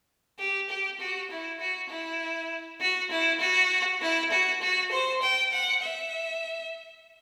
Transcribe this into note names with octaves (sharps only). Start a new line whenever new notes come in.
G4
G4
F#4
E4
F#4
E4
F#4
E4
F#4
E4
F#4
F#4
C5
G5
F#5
E5